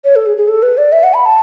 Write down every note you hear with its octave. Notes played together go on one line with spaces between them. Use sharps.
C#5
A4
G#4
G#4
A4
B4
D5
E5
F#5
B5
A5